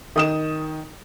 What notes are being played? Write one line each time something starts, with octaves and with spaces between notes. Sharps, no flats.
D#3 D#6 E7